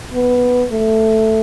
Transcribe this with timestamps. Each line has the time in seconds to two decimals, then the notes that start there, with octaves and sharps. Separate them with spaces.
0.14 B3
0.71 A3